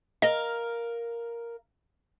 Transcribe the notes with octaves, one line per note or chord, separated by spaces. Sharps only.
A#4 D#5 F5